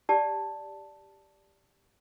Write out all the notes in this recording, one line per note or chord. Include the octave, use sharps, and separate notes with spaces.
G4 D5 A5